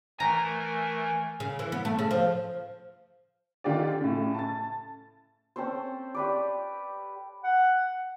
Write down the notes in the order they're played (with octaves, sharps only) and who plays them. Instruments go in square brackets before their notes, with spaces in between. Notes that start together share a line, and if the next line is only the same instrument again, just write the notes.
[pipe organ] E3 A3 A#4 [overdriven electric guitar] G#5 [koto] A#5
[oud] C#3
E3
B3
A3
C#3
F3
[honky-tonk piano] D3 D#3 F4 G4 D5
A2 C#3
A5 A6
[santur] C4 C#4 A4 C5
G4 B4 D5
[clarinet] F#5